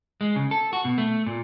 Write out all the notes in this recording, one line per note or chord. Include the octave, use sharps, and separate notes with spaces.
G#3
C#3
A4
F#4
B2
A3
A#2